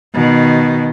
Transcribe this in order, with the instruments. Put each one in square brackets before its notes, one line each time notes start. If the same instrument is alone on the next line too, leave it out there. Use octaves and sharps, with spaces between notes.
[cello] B2 D#3